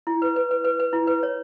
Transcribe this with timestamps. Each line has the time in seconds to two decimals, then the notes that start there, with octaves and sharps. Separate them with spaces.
0.07 E4
0.22 B4
0.36 B4
0.51 B4
0.64 B4
0.79 B4
0.93 E4
1.07 B4
1.23 C#5